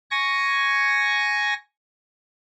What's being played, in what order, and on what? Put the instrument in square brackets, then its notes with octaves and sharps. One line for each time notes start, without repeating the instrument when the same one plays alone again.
[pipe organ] G#5 C#6 A#6